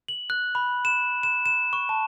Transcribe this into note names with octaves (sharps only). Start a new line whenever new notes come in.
F#7
F#6
B5
E7
E7
E7
C#6
A5